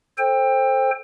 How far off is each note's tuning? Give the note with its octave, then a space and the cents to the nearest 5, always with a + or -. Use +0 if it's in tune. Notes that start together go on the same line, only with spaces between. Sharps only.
A4 +0 C5 +10 G5 +25